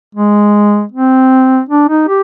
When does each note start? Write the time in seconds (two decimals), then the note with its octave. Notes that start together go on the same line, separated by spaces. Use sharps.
0.15 G#3
0.92 C4
1.69 D4
1.89 D#4
2.08 G4